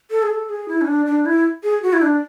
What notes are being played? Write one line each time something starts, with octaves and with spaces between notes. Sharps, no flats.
A4
G#4
A4
G#4
E4
C#4
D4
D4
E4
G#4
F#4
E4
D4